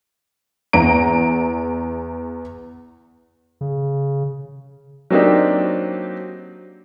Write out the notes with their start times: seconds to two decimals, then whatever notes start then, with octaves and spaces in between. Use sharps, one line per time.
0.73 E2 A#5 D7
3.61 C#3
5.10 F#3 A#3 C4 D4 D#4 G4